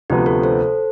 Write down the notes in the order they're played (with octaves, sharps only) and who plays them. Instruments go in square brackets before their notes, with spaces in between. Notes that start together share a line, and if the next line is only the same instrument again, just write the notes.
[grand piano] D2 C3 F3 B3 [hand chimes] G4
[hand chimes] A4
A4 C5